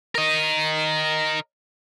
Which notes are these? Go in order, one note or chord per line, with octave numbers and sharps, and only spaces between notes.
A#4 D#5